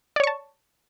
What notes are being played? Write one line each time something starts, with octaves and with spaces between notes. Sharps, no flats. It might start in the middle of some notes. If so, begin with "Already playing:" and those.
C#5 D5 A5 C#6